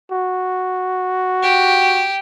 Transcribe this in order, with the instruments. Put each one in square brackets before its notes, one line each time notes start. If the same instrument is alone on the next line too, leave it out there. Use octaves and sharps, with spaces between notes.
[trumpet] F#4
[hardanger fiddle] G4